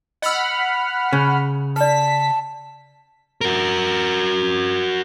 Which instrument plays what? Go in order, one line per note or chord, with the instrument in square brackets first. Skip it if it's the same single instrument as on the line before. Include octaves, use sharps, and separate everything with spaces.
[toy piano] D#5 E6 [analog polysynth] F#5 B5 F6
[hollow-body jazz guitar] C#3
[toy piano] B4 D5 [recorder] A5 [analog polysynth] B6
[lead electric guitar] F#4 A#4